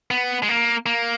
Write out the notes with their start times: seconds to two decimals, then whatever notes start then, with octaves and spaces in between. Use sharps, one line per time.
0.11 B3
0.43 G#3
0.49 A#3
0.86 A#3